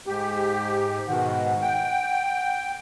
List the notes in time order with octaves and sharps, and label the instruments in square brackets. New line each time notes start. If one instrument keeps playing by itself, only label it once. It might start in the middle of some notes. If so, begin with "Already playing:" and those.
[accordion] G#2 G4
[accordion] G#2 B2 D#3 [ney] F#5
[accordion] G5